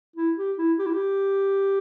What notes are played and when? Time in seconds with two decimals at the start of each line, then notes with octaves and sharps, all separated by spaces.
0.16 E4
0.37 G4
0.58 E4
0.79 G4
0.86 E4
0.93 G4